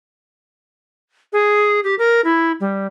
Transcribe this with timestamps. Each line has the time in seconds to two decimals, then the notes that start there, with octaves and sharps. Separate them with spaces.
1.33 G#4
1.84 G4
1.99 A#4
2.24 E4
2.60 G3